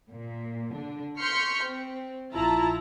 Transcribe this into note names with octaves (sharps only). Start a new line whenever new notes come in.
A#2
D3 D4
C6 C#6 F6 G6 B6 C#7
C4
A#1 E4 F4 A5 A#5